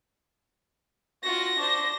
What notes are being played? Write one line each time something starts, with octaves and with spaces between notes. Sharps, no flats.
F4 F#4 A#6
D4 C5